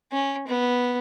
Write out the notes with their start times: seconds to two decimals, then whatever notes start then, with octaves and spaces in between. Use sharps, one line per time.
0.12 C#4
0.48 B3